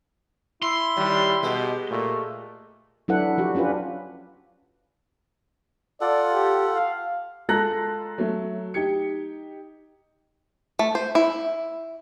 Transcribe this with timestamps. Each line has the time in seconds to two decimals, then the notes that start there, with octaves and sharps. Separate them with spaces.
0.63 E4 C6
0.97 D#2 G3
1.43 B2 G#3 G4
1.90 A#2 A3
3.08 F#3 D4 E4 A4 B4 F#5
3.38 F3 F#4 G4
3.55 C#4 D4 F4 G4 B4
6.01 F4 A4 D5 F#5
6.34 G4
6.73 F5
7.49 G#3 F4 A4 A#5 F#6 A#6
8.18 F#3 A3
8.74 D#4 G4 G#6 C#7
10.79 A3
10.95 C5
11.15 E4